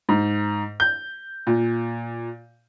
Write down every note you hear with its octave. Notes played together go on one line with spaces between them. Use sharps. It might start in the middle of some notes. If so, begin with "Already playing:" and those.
G#2
G6
A#2